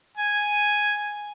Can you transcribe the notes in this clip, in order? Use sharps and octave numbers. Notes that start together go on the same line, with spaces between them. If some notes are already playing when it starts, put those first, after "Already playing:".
G#5